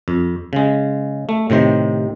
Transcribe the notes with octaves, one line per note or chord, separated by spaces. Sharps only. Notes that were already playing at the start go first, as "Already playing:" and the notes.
F2
C#3 G#3
A3
A2 C3 D#3 C5